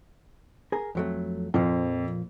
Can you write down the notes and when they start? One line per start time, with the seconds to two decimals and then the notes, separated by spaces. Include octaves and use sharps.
0.72 G#4 A#4
0.95 F2 F#3 A3
1.54 F2 A#2 F3